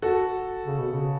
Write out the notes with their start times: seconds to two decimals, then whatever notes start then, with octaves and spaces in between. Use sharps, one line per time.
0.02 F#4 A4
0.66 C#3
0.79 B2
0.93 C#3